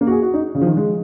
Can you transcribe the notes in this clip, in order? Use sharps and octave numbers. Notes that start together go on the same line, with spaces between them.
A#3
F#4
G#4
F#4
D#4
C#3
F3
D#3
G#3